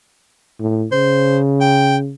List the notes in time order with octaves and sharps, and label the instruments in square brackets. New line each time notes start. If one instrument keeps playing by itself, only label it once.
[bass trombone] A2
[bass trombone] C#3 [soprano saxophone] C5
[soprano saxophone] G5